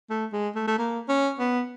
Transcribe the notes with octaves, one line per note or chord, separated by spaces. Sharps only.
A3
G#3
A3
A3
A#3
C#4
B3